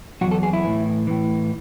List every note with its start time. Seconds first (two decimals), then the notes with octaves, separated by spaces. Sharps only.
0.21 E2 B2 F#3 F#4
0.31 A4
0.43 G#4
0.53 E4
0.64 A2 E3
1.07 A2 E3